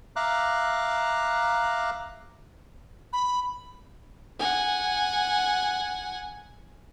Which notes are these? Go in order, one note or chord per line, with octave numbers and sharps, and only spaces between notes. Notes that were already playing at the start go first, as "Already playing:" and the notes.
E5 F5 A#5 D6 F#6
B5
F#5 G#5